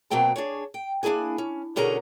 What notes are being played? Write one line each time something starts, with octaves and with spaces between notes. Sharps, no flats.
B2 F#3 A#3 C4 G5 A5
D4 G#4 C#5
G5
A#3 D4 E4 G#4 G#5
C#4
B2 D3 C#4 G#4 A#4 A#5